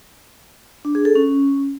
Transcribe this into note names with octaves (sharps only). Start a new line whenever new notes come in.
D4
G#4
A4
C#4